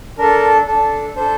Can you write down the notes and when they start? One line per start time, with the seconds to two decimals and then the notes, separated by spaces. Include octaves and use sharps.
0.18 D4 A4 A#4
0.67 D4 A4
1.16 D4 A4 C5